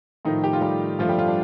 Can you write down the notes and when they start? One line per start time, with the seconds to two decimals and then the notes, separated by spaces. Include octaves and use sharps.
0.25 A2 D#3 F3 A3 D#4
0.44 G4
0.53 F4
0.61 G3 G4
0.99 G2 D3 F3 A3 F4
1.09 G3 G4
1.18 F3 F4
1.28 D4